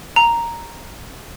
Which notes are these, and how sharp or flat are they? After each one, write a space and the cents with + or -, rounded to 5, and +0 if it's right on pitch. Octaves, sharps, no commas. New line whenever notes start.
A#5 +0